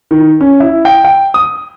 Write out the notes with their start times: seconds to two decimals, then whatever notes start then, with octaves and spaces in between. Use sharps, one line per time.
0.11 D#3
0.41 C#4
0.60 E4
0.85 G5
1.05 G5
1.34 D#6